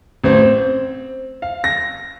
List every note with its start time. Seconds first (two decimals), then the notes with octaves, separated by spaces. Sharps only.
0.24 A1 C4 C5
0.42 C4
1.42 F5
1.64 A#6